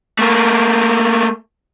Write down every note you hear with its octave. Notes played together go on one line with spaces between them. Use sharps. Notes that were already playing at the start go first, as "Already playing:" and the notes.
A3 A#3